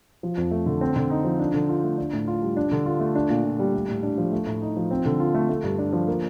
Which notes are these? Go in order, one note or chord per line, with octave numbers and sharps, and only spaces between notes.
F3
F2
A3
D3
C4
D3
D#4
F3
D4
D3
F4
A3
D4
A2
F4
G3
D4
D3
F4
A3
D4
A#2
A#2
G3
A3
A2
D4
F3
A3
A2
D#4
F3
C4
D3
F4
A3
A3
G2
D4
F3
A#3